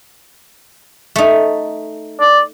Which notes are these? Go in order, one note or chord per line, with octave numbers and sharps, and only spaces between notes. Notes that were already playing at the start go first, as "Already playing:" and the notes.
A3 D#4
D5